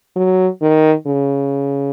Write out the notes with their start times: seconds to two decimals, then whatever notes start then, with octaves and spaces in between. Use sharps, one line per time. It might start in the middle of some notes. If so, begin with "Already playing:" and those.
0.16 F#3
0.62 D#3
1.07 C#3